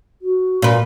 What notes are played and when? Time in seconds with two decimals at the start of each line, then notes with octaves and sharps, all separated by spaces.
0.22 F#4
0.62 A#2 B4